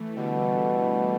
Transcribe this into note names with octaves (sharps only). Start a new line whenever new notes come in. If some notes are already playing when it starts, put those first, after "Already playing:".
Already playing: E3 A3
B2 D3 G3